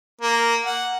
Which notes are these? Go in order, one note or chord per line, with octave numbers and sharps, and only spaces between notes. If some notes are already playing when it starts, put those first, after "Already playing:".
A#3
F#5